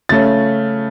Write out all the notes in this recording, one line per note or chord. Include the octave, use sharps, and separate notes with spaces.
C#3 A3 C#4 A6